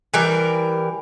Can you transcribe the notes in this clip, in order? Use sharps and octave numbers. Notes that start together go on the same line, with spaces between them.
E3 G3 A#4